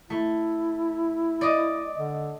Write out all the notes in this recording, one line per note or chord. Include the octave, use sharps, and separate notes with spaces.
A3 E4
D5 D#5
D3